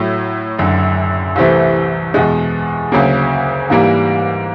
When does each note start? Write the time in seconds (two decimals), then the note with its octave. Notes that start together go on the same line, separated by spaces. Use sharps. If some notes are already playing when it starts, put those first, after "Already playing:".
Already playing: A2 F#3 A3
0.58 F#1 F#2 D3
1.36 C2 C3 E3 A3 C4
2.14 E2 B2 G#3
2.92 D2 C#3 F#3 A#3
3.70 G#2 E3 G3 A#3